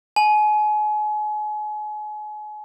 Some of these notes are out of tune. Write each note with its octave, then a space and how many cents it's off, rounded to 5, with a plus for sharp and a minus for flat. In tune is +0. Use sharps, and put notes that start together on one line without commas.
G#5 +35